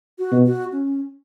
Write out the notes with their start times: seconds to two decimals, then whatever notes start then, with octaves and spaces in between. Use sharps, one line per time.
0.19 F#4
0.32 B2
0.46 F#4
0.72 C#4